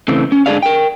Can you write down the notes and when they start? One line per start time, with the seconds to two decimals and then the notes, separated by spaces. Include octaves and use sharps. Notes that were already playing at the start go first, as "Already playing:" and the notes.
0.08 C#3 E3 A3 C4
0.32 C#4
0.46 G#2 D3 D4 G#4 D5 F5
0.63 A#4 G5